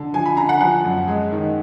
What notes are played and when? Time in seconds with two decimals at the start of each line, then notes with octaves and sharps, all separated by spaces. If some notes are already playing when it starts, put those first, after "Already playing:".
Already playing: D3
0.14 F3 G#5
0.26 B5
0.37 D3 A#5
0.49 F#5
0.61 F3 F#5
0.85 F#2
1.08 G#3
1.32 D#3